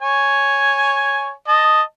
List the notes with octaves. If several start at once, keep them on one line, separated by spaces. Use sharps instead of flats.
C#5 G#5
D#5 A5